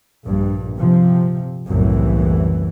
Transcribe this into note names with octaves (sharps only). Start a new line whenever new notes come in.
A#1 G2
C3 F3
F#1 C2 F#2 A2 E3